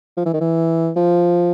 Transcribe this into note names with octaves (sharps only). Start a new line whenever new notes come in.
F3
E3
D#3
E3
F3